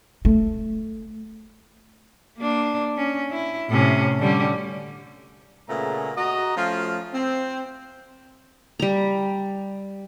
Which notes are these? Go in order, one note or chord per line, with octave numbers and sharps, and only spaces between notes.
A3
A#3 D4
C#4
E4
A2 C3 C#4
D3 G3 C#4
A#2 C#3 A3 B3 G#4 A#5
F#4 D#5 A#5
F3 A3 C#4 F4
C4
G3 A#5